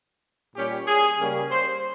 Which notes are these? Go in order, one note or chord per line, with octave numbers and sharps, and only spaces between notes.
A#2 G3 C#4 G4
G#4
C#3 G3 A#3 C#4
C5